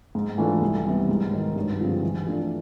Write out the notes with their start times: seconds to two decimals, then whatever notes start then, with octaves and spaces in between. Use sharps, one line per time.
0.15 G#2
0.38 E3 A3 D4 F4
0.61 C2
0.85 C3 E3 G3 B3
1.09 G#2
1.32 D#3 F#3
1.56 G2
1.80 D3 F3 G#3 C4
2.03 E3
2.27 A3 D4 F4